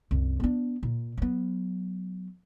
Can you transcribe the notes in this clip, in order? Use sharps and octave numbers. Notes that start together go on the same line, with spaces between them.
C2 F#2
B3 D4
A#2
F#3 B3